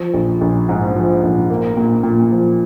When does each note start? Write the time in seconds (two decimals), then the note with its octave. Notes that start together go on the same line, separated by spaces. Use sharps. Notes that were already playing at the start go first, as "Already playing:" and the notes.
Already playing: F3
0.14 A#1
0.41 A#1
0.69 G#2
0.96 F3
1.23 A#1
1.50 A#3
1.77 A#2
2.03 A#2
2.32 F3